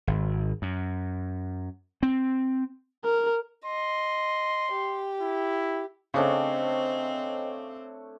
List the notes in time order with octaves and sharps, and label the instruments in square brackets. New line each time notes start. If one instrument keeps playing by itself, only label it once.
[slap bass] G#1
F#2
C4
[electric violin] A#4
[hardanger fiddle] D#5 [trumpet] C6
[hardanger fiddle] G4
[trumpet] E4
[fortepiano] C#3 [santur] A3 D4 C#5 [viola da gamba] C4 [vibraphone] C5 D#5 G5